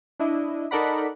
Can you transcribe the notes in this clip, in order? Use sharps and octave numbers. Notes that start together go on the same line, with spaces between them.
D4 E4 D#5
D#4 A4 A#4 D5 F#5 B5